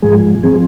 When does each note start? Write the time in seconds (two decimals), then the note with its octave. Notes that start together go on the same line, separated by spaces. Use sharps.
0.02 G#2 F3 G#3 G#4
0.43 F3 C4 G#4